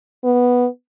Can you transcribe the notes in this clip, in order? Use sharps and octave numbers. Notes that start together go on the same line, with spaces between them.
B3